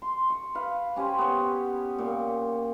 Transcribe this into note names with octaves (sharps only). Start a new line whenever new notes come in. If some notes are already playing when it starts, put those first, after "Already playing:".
C6
C#6
B4 F5
C#4 G4 C5 G#5
B3 C#5
A#2